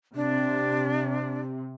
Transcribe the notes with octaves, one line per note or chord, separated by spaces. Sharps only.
C3 D4